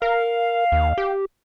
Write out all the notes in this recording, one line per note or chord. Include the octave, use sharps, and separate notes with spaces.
A#4 F5
D#2
G4